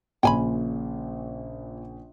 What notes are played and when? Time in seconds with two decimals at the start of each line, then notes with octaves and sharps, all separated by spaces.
0.23 A#1 A#2 C#3 G5 G#5 B5